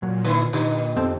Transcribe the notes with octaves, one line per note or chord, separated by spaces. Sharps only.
A#2 F#3
D3 E4 B4 C5
A#2 D3 D#4 G4
F2 C4 A4 C5